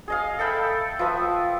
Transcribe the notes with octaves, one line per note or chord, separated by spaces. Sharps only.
G#4 D#5 F5
A4 E5 G5 B5
F3 B4 E5 D#6